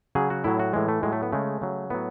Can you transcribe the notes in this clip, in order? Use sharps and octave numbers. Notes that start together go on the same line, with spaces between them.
C#3 F#3 G#4
F#4
A2 F#3 E4
F#4
A2 E3 G#3
A3
A2 F#3 G#3
A3
B3
C#3 G#3 A3
C#3 F#3
A2 F#3 B3